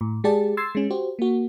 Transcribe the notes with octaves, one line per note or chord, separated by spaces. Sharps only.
A2
G#3 G4 G#4 D5 A5
C6 E6 G#6 A6 C7
G#3 C#4
F#4 G4 C5
A#3 F#4